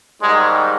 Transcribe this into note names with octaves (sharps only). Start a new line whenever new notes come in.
G#2 D#3 G3 G#3